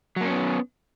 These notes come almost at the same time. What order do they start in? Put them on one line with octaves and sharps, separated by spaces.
F#3 A#3 C#4 B3